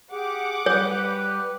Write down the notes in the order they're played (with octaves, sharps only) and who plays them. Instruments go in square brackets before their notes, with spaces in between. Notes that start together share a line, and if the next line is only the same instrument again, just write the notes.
[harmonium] G4 [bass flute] G#4 [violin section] F#5 D6
[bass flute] G3 [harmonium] G4 B4 [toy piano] C#5